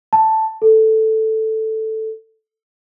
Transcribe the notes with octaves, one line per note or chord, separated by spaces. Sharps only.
A5
A4